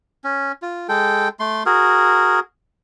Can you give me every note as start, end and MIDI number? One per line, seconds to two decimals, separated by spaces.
0.24 0.52 61
0.62 0.87 65
0.89 1.28 56
0.89 1.28 69
0.89 1.28 79
1.39 1.63 57
1.39 1.63 84
1.66 2.40 66
1.66 2.40 68
1.66 2.40 70